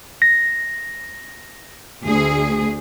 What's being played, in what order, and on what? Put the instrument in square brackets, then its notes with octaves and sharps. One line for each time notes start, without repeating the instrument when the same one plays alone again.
[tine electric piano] A#6
[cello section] D2 G#4